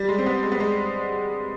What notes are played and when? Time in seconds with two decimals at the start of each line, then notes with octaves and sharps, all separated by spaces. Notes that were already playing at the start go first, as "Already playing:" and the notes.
Already playing: G3
0.09 G#3
0.18 C4
0.26 B3
0.43 G#3
0.52 B3
0.60 G#3